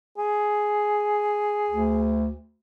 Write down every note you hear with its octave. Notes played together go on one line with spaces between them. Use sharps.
G#4
D2